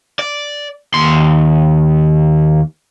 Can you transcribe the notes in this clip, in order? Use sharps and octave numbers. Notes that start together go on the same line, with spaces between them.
D5
D#2 C6